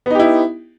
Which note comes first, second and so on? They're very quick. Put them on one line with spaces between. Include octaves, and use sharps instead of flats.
B3 D#4 G4 E4